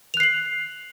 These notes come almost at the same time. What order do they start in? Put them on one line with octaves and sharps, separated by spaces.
F7 F#6 C7 F#7